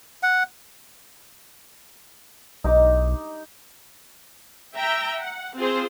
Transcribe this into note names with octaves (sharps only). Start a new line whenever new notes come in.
F#5
B1 D#4 A#5 D6
E5 G5 A#5
F#5
C4 F4 G#4 C5